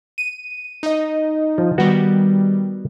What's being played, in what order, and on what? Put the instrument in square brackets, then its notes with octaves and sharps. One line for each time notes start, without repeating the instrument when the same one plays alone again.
[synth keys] D#7
D#4 D#5
[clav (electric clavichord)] F3
[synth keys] D#3 G3 [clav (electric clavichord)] B3 F#4